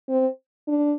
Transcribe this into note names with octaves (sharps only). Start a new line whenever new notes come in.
C4
D4